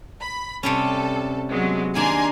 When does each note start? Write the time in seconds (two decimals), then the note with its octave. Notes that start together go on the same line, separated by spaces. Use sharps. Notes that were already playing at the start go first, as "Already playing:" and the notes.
0.21 B5
0.63 C3 G3 C#4 A4
1.50 F#3 G#3 B3
1.95 D#3 A#3 D4 G#5 A#5 C6